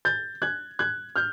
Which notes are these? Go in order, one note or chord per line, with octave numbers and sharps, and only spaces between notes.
G6 A6
F#6 G#6
F#6 G#6
F6 G6